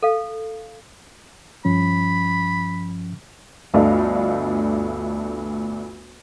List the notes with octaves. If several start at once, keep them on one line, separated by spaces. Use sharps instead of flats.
A4 F5
G2 F3 C#4 B5
G1 D2 A3 D4 D#5 F5